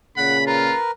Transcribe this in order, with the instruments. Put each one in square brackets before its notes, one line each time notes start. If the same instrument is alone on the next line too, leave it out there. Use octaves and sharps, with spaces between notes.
[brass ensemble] A#2 C#3 [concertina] F#5 [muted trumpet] B5
[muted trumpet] F4 [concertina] A#4 B4